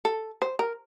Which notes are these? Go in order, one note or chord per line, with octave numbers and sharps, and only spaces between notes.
A4
C5
A#4